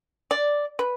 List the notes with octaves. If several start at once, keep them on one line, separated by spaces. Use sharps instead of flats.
D5
B4